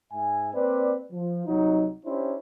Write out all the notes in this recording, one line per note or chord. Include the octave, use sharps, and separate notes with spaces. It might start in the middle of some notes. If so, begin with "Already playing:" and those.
G#2 E5 G#5
A#3 C4 B4 D5
F3
C2 F#3 D#4
C#4 D4 E4 G4 C5